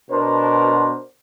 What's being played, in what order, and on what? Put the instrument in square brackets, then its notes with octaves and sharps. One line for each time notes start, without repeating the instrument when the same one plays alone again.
[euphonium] B2 [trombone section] D4 A#4 C5